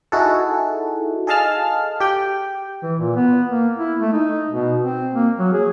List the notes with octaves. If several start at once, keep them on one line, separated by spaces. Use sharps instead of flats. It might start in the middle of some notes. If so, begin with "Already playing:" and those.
D#4 E4 F#4 G#4 A4
G#4 A4 D#5 F5 A5 F6
G4 G5
E3
A#2
B3
A#3
E4
A3
D#4
B2
C4
A#3
F#3
G#4